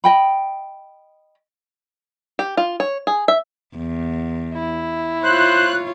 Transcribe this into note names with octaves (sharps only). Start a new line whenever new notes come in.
D#5 G5 B5
G4
F4
C#5
G#4
E5
E2
E4
F4 C5 C#5 F#6